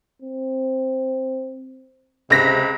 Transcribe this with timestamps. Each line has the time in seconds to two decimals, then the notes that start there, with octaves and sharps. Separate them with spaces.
0.22 C4
2.30 C#2 C3 A#6 B6